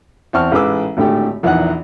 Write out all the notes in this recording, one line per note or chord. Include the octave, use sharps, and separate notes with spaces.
E2 C4 A5 C#6 F6
A1 G#2 G#4 B4 D6 E6
G#1 A2 D3 A3 G4 G5
A#1 E2 E3 D#4 F#5 F#6